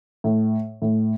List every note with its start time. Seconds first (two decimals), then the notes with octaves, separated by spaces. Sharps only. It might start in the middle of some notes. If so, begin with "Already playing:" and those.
0.24 A2
0.82 A2